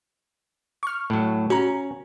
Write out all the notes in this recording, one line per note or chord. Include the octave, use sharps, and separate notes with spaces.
C#6 F6
A2 F#3
C#4 F#4 A#5